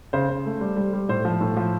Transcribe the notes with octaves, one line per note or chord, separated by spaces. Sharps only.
C#3 C5
C#3
A3
G3
G3
G3
A2 C5
F3
A2
F3